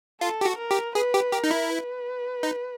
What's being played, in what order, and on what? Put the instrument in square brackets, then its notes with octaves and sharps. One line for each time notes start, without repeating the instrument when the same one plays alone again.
[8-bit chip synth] F4 [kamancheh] A4
[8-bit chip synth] G4
F#4
[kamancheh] A#4
[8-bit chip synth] G4
[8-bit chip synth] G#4 [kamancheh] B4
[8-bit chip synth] G4
[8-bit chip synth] G4 [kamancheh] A#4
[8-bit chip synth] D#4
E4
[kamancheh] B4
[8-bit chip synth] D#4